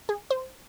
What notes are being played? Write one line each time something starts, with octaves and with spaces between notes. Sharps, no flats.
G#4
C5